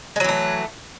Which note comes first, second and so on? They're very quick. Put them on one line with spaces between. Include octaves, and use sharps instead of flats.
G#3 F#3 E3 A3